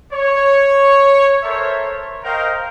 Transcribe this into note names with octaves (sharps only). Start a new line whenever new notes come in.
C#5
A4 A#4 C5 C#5 E5
A#4 C5 D#5 F5 G5 A#5